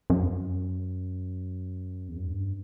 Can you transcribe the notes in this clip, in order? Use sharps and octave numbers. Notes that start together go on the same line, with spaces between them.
F#2
E2
F#2
G2